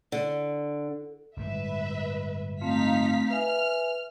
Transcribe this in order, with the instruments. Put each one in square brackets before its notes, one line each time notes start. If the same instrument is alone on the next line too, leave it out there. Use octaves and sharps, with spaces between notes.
[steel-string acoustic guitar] D3
[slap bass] G1 A2 G#3 [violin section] B4 E5
[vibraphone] A3 C4 F4 [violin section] D#4 F5 B6
[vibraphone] B4 E5 G#5 [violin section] F6